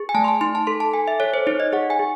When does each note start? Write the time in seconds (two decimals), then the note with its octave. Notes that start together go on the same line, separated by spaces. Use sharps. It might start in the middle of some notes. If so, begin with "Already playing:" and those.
Already playing: G#4
0.09 G#5
0.14 A3 A5
0.24 C6
0.28 A5
0.41 D#4 C6
0.55 A5
0.67 A4 C6
0.80 A5
0.93 A4 G#5
1.08 E5
1.20 A4 C#5
1.34 C5
1.47 D#4 C#5
1.60 D#5
1.73 G#4 F#5
1.90 G#5
1.99 G#4